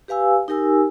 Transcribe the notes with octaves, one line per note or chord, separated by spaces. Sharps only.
G4 B4 F5 G#5 E6
D#4 G4 A#4 G#5 E6